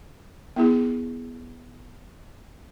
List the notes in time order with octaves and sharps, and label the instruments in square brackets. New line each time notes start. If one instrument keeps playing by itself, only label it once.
[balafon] B3 E4 G#4